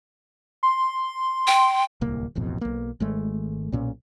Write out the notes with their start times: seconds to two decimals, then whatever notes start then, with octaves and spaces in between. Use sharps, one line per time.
0.63 C6
1.47 G5
2.01 D1 C2 A#3
2.35 D1 A1 F2 B2
2.61 B1 A#3
3.00 G#1 G#3 A3
3.72 B1 A#2 C#4